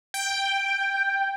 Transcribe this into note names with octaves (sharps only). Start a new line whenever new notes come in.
G5